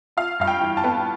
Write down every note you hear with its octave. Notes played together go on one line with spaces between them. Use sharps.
F4 F5
G2 F5
G5
E3
A5
B3